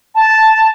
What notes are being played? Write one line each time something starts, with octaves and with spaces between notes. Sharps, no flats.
A5